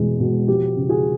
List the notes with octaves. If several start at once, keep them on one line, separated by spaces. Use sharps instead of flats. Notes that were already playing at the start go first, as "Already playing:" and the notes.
Already playing: E1 E2 B2 G#3
B2
F3 G4
C#3
F#4 G#4